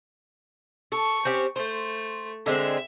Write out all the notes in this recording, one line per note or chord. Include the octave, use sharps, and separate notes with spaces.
A4 C#6
C4 C#4 G4
A3 C5
D3 G#3 C4 E5